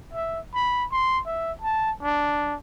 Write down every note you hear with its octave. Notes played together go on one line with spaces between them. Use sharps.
E5
B5
C6
E5
A5
D4